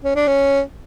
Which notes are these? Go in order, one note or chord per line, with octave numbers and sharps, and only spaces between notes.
C#4
D4
C#4